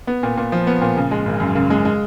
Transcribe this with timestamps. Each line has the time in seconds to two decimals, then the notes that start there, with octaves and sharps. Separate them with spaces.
0.07 B3
0.23 A#2
0.37 A#2
0.52 F3
0.67 B3
0.81 A#2
0.97 C#3
1.11 G#3
1.26 G#1
1.40 F#2
1.55 C#3
1.70 G#3
1.85 G#3